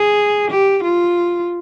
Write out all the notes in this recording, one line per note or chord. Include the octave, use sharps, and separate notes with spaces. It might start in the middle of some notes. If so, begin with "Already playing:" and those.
Already playing: G#4
G4
F4